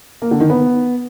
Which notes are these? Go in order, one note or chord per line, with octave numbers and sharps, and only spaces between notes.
A#3
D3
D#3
B3